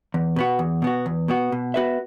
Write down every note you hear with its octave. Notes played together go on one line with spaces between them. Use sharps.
E2
B2 B3 F#4
E2
B2 B3 F#4
E2
B2 B3 F#4
B2
B3 F#4 B4 E5